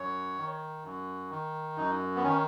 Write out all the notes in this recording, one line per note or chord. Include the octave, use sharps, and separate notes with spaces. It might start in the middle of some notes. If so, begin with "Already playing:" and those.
Already playing: F#2 C#5
D#3
F#2
D#3
F#2 D#4
B3
D#3 C#4